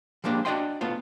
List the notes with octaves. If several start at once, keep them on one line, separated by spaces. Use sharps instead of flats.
F3 G#3 A#3 D4 G4
D4 F#4 D5 D#5 G5 C6
B1 A3 B3 F4